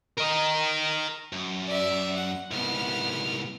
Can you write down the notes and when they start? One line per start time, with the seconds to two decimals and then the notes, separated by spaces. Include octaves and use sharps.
0.18 A#4 D#5
1.33 F#2
1.67 D5 E5
2.15 F#5
2.51 C2 G#2 B3 F6